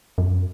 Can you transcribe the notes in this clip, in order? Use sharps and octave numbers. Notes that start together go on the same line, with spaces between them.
F#2